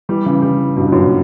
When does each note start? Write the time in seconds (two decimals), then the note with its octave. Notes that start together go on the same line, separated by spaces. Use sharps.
0.09 E3 G3
0.26 C#3 E3
0.42 E3 G3
0.76 G2 B2
0.86 B2
0.92 F#2 A#2